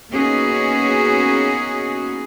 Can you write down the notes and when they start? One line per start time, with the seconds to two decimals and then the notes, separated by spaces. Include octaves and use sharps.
0.11 A#3 B3 C#4 D#4 F#4 G#4